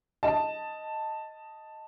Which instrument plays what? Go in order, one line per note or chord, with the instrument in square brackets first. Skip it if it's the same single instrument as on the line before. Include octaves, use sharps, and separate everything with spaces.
[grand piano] D#5 A5